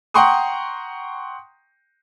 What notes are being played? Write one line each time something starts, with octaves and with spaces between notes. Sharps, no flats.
F#5 G5 A#5 C6 C#6 D#6